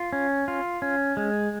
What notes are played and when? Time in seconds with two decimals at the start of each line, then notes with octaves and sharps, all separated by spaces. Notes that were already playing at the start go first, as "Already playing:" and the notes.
Already playing: F4
0.13 C#4
0.48 F4
0.82 C#4
1.17 G#3